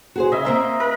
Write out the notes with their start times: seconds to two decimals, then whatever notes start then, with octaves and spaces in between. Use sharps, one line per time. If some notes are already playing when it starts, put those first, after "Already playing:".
0.16 F#4 G#4 C5
0.32 C#3 D#5 E5
0.45 A#3 C4 A#4 E5
0.80 A#4